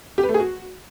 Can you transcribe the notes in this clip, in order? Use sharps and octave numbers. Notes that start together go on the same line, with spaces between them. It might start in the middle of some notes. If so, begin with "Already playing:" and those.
G4
B4
A3
G#4
F#4